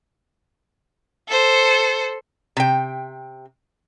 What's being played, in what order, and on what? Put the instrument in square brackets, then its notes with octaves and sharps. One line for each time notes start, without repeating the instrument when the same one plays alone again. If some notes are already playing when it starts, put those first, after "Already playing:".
[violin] A4 C5
[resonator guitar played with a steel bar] C3 G5